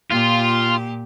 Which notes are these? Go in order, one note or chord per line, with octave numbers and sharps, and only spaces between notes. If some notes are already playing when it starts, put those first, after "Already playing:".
A#2 F4 G4